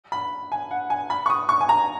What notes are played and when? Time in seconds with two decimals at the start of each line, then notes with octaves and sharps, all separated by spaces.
0.12 B5
0.52 G#5
0.71 F#5
0.90 G#5
1.10 B5
1.26 C#6
1.30 D#6
1.49 C#6
1.61 G#5
1.69 A#5